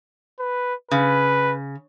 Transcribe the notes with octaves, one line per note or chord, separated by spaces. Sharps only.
B4
C#3 B4